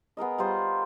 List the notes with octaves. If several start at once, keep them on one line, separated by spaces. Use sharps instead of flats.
B3 G#4 A#4 D#5
G3 F4 A#4 C5